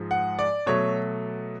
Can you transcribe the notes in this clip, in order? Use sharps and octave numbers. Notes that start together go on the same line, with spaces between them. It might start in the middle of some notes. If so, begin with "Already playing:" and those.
Already playing: G#2 F3 G#3
F#5
D5
B2 F#3 A3 C#5